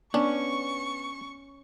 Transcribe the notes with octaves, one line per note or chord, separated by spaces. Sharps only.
B3 C#4 D4 C#6